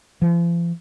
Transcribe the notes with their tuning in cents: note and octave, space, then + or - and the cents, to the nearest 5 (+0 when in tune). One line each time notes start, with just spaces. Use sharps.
F3 -40